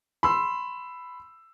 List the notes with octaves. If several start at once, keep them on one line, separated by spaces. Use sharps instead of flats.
B5 C6 E6